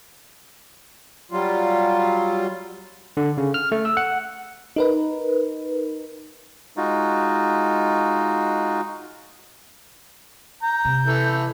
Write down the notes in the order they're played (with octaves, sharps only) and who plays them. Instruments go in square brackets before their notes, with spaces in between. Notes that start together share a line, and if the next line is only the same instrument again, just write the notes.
[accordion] F#3 G3 F4
[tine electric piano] D3
C#3
F6
A3
E6
F#5
[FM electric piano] D#4 A#4 B4
[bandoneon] G#3 D#4 F4 F#4
[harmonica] A#5 [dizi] G6
[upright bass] C3
[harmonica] E3 A4